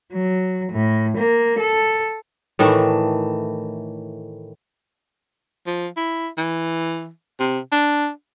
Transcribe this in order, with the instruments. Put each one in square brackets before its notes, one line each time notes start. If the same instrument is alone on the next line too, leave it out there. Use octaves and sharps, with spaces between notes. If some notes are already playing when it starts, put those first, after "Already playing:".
[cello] F#3
A2
A#3
A4
[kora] A2 D#3 E3 A3
[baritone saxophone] F3
E4
E3
C3
D4